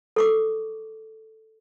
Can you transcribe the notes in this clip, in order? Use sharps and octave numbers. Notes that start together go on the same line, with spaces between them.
A4 C#6 D6